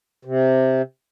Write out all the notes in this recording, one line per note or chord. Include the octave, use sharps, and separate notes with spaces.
C3